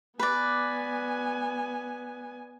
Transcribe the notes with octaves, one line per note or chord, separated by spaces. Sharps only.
B3 B4 D5 G#5